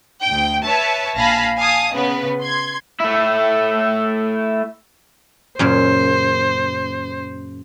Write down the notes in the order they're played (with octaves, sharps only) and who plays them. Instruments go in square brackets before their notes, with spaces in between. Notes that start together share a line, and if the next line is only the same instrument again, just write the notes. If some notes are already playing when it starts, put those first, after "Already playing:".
[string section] D2 G5
B4 C#5 E5 A5
A#1 F5 G#5 A5 B5 A#6
F5 G#5 A5 D#6
C#3 B3 B4
C6 G#6
[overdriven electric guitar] A3 E4
[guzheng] F#2 A#2 C#3 [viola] C5